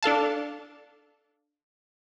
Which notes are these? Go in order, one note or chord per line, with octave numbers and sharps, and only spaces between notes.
D4 A4 F5 A5